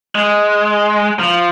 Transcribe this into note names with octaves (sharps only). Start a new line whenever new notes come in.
G#3
F3